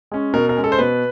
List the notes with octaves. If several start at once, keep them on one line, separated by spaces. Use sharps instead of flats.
G#3 C#4
B2 A#4
A#4
G#3 C#4
A4
C5
B2 B4